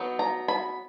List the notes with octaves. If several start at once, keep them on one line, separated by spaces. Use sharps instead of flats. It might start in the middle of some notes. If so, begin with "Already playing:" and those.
Already playing: F#3 B3 D#4
A#5
B5